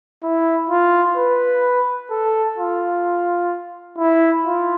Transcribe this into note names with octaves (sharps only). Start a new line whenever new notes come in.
E4
F4
B4
A4
F4
E4
F4